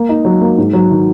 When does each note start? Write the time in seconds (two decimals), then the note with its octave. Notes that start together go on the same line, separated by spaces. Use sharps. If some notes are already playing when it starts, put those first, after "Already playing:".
Already playing: A#3
0.09 D#4
0.25 F#3
0.41 A#3
0.58 G#2
0.73 F#3
0.91 D#3